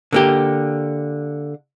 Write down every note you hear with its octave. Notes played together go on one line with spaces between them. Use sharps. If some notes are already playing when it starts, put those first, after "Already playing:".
D3 A#3 G4